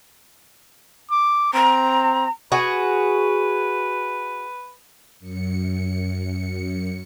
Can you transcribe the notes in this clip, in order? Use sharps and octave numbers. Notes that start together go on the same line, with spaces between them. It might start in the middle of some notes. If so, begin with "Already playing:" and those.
D6
C4 A#5
F#4 G#4 B4
F#2 C#7